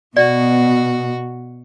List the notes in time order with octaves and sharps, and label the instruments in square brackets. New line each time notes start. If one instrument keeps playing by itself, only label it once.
[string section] B2 [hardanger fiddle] F#4 [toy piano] D5